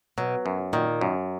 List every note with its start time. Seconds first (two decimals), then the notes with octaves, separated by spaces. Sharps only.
0.18 B2 F#3
0.46 F#2
0.73 A#2 D#3
1.01 F#2